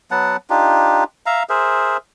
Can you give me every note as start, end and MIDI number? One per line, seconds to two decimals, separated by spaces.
0.11 0.37 54
0.11 0.37 59
0.11 0.37 78
0.11 0.37 81
0.50 1.04 62
0.50 1.04 63
0.50 1.04 65
0.50 1.04 67
1.26 1.43 76
1.26 1.43 77
1.26 1.43 82
1.49 1.97 68
1.49 1.97 70
1.49 1.97 72
1.49 1.97 76